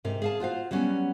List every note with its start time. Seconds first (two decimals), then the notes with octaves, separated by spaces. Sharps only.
0.04 G#2 C3 A#4
0.22 G#4 F5 A5
0.40 F4 F#4 C5 F5
0.71 F#3 G3 B3 C#4